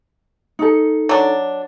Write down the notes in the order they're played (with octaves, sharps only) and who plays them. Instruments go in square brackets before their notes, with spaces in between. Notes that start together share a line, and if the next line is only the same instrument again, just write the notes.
[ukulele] D#4 A4
[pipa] F#3 D4